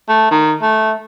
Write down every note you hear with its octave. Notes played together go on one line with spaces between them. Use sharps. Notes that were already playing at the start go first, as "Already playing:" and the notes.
A3
D#3
A3